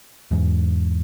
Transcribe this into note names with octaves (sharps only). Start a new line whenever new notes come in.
E2 G#2